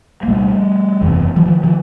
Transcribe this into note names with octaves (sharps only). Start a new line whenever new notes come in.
A#3
C2 A#2 G3 A3
F#1 E2 C3
E3 F#3
D#3 F3
D#3 F3